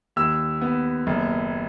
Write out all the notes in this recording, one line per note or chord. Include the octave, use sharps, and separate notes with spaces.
D#2 E6
B3
F#1